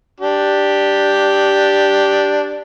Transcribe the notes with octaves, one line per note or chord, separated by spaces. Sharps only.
D4 G4